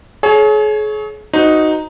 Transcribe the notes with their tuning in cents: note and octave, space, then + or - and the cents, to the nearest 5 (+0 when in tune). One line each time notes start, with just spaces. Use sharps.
G#4 +40 C#5 +0
D#4 +0 F#4 +0 C5 -30